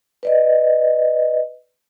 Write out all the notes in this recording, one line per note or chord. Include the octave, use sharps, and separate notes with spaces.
B4 D5 D#5